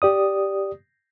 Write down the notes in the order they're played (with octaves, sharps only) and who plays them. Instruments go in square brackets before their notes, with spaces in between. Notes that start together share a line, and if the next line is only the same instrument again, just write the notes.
[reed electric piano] G4 D5 D#6